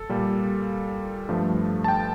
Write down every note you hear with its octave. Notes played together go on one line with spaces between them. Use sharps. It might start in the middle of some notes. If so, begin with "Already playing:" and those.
Already playing: A4
A#2 G3 A#3
G2 F3 A3
A5
G5